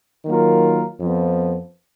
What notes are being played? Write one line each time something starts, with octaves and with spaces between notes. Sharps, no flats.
D#3 F#3 A#3 F4 A#4
F2 F3 B3